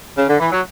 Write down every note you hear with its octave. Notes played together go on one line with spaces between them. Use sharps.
C#3
D3
E3
F#3